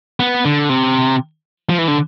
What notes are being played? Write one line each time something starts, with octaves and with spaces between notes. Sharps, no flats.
B3
D3
C3
F3
E3
D3